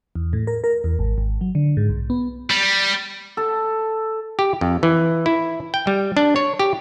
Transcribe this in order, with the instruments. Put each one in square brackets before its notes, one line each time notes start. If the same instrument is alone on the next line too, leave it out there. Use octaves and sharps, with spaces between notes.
[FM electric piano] E2
A2
A#4
A#4
E2
G#1
G#1
F#3
D3
G#2
B1
B3
[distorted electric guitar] G3
[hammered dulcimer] A4
[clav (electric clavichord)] G4
F2
E3
E4
G5
G3
D4
C#5
G4